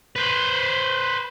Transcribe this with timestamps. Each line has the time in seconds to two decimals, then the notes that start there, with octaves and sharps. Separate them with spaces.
0.16 B4 C5